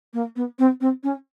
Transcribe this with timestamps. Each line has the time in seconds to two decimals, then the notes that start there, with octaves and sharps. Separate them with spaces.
0.14 A#3
0.36 B3
0.59 C4
0.81 C4
1.03 C#4